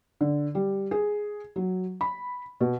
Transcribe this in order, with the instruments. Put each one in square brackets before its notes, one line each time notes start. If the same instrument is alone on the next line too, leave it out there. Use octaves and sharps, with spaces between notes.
[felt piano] D3
G3
G#4
F#3
B5
B2